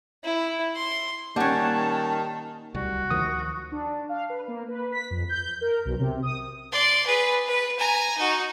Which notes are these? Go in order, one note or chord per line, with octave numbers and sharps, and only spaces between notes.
E4
C6
D#3 G3 A#3 C#4 F#5 A5
D1 C2 G3 F#4
D2 D#3 F3 D#6
D4
F5
B4
A#3
B4
B6
F2
G6
A#4
B1
C3
D#6
D5 C6
G#4 B4
B4
G#5 A#5
D#4 F#4